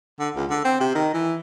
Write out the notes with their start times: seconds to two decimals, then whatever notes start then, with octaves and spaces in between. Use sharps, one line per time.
0.20 D3
0.36 C#2
0.50 D3
0.65 C4
0.80 C3
0.95 D#3
1.14 E3